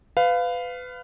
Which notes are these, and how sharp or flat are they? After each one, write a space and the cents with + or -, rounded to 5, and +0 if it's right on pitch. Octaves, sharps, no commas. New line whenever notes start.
B4 +25 F5 +0